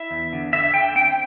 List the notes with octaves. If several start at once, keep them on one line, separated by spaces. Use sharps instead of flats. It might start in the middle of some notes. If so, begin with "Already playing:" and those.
Already playing: E4 E5
E2
D3
D3 E5
D3 G5
C4 G5